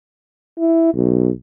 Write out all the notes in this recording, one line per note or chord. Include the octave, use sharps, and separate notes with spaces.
E4
B1